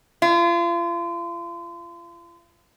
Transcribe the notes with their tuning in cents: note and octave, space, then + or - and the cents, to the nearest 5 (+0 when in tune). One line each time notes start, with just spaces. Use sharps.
F4 -35